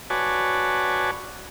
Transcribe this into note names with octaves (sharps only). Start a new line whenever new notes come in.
F#4 B4 C#5 D5 G#5 A5